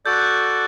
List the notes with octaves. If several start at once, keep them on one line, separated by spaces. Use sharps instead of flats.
F#4 A4 D5 G6
F#6
G6